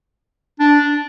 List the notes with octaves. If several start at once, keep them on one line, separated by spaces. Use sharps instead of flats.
D4